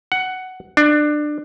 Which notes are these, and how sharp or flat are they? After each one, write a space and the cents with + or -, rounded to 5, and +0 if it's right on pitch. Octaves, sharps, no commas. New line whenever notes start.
F#5 +10
D4 +20